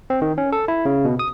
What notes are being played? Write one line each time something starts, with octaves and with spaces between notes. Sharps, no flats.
C4
D#3
C#4
A4
E4
C#3
B2
D#6